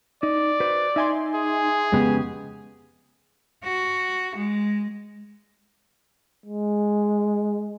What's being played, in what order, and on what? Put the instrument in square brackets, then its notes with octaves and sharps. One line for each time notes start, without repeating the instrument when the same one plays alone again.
[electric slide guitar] D#4 [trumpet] D5
[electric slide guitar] F#4 B4 C5
[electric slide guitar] D#4 [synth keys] E5 G#5 C6
[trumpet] G#4
[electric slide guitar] F2 C#3 G4 [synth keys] G#3 B3
[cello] F#4
G#3
[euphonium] G#3